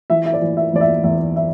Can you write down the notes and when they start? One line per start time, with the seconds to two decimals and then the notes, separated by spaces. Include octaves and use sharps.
0.10 E3 E5
0.25 E5
0.34 D5
0.42 E3
0.57 E5
0.73 E2 D5
0.81 E5
1.04 E2 E5
1.36 E5